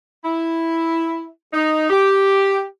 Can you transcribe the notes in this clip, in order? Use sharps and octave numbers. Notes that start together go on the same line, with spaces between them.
E4
D#4
G4